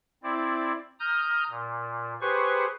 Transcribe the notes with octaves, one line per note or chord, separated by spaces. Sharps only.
C4 E4 D5
A#5 D#6 F6 G6
A#2
G4 G#4 B4 C5 C#6